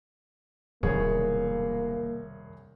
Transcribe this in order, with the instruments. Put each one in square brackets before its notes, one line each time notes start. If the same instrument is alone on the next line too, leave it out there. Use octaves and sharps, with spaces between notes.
[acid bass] D1 [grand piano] C2 G#4 C#5 [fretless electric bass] F2 B2 D#3 [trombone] A#3